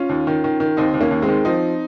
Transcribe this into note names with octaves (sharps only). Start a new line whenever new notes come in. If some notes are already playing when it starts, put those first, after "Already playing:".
Already playing: C#4 F4
D#2
D#3
D#3
D#3
D#2 C4 D#4
D#2
A#3 C#4
D#2
G#3 C4
D#3
F3 C4 D#4